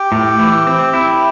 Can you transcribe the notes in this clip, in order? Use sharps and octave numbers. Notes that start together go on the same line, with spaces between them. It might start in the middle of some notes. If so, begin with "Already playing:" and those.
Already playing: G4 G5
A2
E3
C4
E4